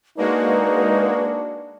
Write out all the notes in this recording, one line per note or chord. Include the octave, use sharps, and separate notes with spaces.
G#3 A#3 D4 D#4 F#4 B4